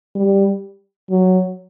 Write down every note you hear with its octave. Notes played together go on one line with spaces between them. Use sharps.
G3
F#3